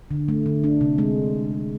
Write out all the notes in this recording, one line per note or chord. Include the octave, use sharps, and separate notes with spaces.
D3
A3
D3
D4
C3
G#3